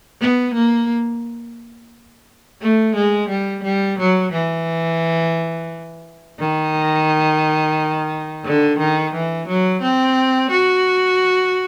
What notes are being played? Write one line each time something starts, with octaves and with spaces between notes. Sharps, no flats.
B3
A#3
A3
G#3
G3
G3
F#3
E3
D#3
D3
D#3
E3
F#3
C4
F#4